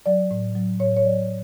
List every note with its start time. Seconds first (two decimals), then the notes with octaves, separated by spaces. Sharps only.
0.06 F#3 D5
0.31 A2
0.55 F#3
0.80 A2 C#5
0.97 C#5
1.05 F#3 D5